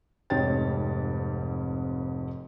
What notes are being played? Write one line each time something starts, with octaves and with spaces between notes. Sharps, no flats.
F1 F2 G#2 C#5 G5 A6